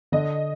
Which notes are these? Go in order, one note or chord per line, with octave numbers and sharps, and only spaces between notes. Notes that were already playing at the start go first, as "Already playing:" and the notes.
D3 D#5